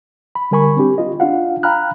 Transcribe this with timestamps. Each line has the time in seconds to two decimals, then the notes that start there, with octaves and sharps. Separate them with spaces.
0.35 B5
0.51 D3 G3 A#4 G#5 B5 C#6
0.77 C4 D4 G4
0.98 F4 D#5
1.20 D4 F4 F5 F#5
1.63 F5 G5 A#5 B5 F6 F#6